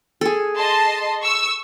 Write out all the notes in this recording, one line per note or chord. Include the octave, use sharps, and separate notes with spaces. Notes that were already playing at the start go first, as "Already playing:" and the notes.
G#4 A4
D#5 A5 C6
C#6 E6